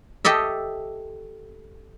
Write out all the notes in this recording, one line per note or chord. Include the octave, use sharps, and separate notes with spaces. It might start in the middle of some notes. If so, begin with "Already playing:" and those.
G4 A4 D#5 E5